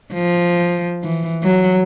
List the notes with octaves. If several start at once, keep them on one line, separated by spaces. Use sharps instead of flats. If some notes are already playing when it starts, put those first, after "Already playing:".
F3
E3
F#3